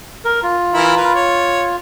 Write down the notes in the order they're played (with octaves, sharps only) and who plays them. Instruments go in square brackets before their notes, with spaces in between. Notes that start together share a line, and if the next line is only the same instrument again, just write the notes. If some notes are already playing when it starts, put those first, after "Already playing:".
[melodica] A#4
F4
[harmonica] E3 E4 A#4
A#4 B4
C#5